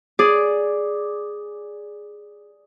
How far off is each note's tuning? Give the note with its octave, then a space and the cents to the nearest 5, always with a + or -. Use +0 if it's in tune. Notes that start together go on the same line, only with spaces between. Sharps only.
G#4 +0 D5 +0